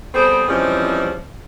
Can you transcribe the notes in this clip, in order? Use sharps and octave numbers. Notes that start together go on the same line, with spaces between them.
G3 B3 C4 G#4 A4 C5
E3 F3 G3 G#3 C4 C#4